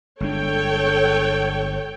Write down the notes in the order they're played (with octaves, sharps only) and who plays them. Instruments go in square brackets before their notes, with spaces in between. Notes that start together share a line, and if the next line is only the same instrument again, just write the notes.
[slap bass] G1 G#3 D4 [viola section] A4 C#5 G5